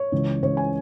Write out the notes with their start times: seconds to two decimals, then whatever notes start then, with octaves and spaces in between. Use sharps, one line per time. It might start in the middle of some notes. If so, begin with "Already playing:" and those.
Already playing: C#5
0.12 C#2 C#3 E3
0.42 C#2 C#3 E3 C#5
0.57 G#5